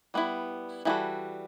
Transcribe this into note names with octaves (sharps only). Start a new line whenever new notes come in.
G3 B3 E4
E3 G3 B3 F#4 A4